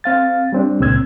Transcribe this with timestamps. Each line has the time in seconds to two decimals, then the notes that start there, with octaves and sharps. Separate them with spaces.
0.04 C4 F5 A6
0.52 G3 C4 D4
0.80 C#2 A#2 C4 E6 G#6